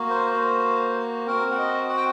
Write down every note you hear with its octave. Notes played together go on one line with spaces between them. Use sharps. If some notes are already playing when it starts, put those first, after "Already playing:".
Already playing: A#3 F#4
C5
C5
C4 F#4 A#4
F#5
D#5
F#5
G5